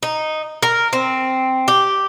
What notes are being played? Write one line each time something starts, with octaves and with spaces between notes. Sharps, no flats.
D#4
A#4
C4
G4